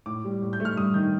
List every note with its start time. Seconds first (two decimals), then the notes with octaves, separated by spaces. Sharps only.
0.06 A2 D6
0.24 G3
0.42 A2
0.53 G6
0.60 A3
0.65 F6
0.77 G2 D#6
0.94 D#3 G6